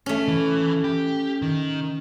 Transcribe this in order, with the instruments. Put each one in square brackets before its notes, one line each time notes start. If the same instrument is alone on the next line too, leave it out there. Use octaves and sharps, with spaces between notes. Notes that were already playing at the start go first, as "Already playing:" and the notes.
[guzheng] A3 C#4
[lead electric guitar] E3
G4
D#3